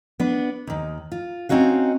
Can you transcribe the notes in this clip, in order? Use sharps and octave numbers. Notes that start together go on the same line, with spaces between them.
B3 D4
D#2 D#3
F4
C4 C#4 D#4 F#4 F5